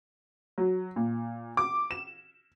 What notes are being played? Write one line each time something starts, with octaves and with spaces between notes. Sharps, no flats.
F#3
A#2
D6
E7